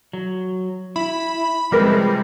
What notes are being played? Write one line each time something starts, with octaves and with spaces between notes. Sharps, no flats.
F#3
E4 B5
C3 F3 G3 G#3 G#4 A#4 B4